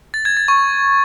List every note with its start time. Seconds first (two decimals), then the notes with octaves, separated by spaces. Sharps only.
0.14 A6
0.25 G#6
0.37 A6
0.48 C#6